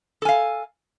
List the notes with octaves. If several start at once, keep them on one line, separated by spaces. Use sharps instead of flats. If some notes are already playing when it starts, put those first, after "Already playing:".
A4 F5 G#5